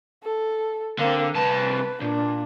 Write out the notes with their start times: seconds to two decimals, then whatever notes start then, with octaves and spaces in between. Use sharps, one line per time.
0.23 A4
0.99 D3 A#3 C4
1.35 C2 B4 A5
2.02 A#2 D4